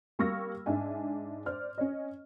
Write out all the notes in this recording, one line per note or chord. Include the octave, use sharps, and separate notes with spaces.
G3 A#3 C#6 E6 F6 A#6
G#2 D4 E5 G#5
C5 D5 F6
C#4 C#5 D#5